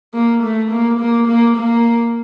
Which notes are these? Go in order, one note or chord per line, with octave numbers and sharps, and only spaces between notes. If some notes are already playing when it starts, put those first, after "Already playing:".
A#3
A3
A#3
A#3
A#3
A#3